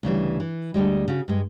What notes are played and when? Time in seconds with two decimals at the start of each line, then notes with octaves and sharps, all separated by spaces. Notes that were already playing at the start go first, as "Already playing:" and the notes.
0.03 D2 C#3 E3 G3
0.40 E3
0.74 D2 D3 G3 G#3
1.08 C#3 F#4
1.28 G2 G#3